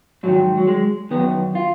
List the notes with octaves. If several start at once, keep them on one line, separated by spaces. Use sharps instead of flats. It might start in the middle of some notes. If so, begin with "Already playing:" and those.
G#2 D#3 F#3
F#3
G#3
F#2 D#3 B3
F4